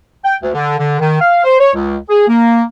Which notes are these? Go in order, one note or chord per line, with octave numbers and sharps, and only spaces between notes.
G5
D2
D3
D3
D#3
F5
C5
C#5
C#2
G#4
A#3